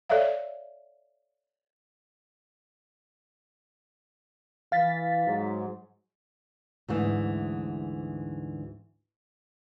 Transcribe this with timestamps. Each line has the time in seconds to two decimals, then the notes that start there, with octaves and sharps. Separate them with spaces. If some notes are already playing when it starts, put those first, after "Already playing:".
0.09 A4 C#5 D5 E5 F5
4.72 E3 F5 A6 B6
5.26 G#2 F#3
6.88 D2 G#2 E3